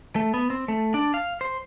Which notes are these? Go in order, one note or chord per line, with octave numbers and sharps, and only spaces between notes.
A3
B3
C4
A3
D4
F5
C5